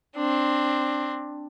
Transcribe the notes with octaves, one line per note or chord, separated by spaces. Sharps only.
C4 D4